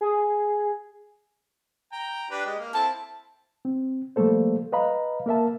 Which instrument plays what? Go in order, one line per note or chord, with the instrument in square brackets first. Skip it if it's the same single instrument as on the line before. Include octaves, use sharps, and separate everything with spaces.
[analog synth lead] G#4
[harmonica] G5 A#5
D4 G4 B4
G#3 G4 D#5
A#3 F5
[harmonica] C4 E4 [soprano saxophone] A5
[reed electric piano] C4
F3 G3 A3 A#3 A4 C5
B4 D#5 F5 A#5 B5
A#3 A#4 E5 A5